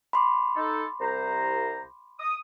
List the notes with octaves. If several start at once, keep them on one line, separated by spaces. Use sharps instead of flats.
B5 C6 D6
D#4 A4
C2 C5 A#5
D#6